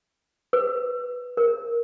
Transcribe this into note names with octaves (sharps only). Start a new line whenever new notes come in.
B4
A#4